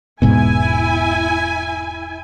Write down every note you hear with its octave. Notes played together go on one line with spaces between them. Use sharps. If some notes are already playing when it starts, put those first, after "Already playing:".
E1 G#2 B2 E4 G#5